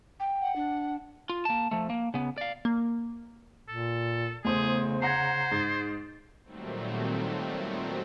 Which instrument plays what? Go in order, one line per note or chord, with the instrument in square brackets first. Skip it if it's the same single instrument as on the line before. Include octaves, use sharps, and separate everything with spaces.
[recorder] G5
[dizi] F#5
[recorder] D4
[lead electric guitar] F4
A#3 A5
F3 A3
A#3
C#3 B3
D5 F5
[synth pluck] A#3
[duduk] A#2 [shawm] A4
[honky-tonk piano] E2 C5 [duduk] C#3 [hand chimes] A3 [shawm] G#4
[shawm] C5 [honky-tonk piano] F#5 A#5 [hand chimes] G#6 A#6 C7
[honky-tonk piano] G#2 A6
[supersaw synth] A#2 D#3 F#3 G3 A3 C4